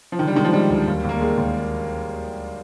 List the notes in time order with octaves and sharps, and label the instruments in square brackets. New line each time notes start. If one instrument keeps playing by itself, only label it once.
[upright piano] F3
[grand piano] D3 [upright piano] D#3
[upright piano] G3
[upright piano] D#3 [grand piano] G#3
[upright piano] F3
[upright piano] G3 [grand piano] G#3
[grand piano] D2
D#2
D#2
[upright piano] A#3
[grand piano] D#3 [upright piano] G#3
[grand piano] D#2